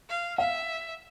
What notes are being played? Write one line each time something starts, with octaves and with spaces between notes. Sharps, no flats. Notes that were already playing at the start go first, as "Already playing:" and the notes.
F5
E5 F5